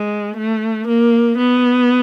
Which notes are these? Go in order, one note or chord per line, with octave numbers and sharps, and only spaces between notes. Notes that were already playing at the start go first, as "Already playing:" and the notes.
Already playing: G#3
A3
A#3
B3